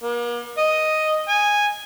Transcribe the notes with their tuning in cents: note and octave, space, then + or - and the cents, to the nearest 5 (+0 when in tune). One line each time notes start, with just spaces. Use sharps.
A#3 +40
D#5 +0
G#5 -10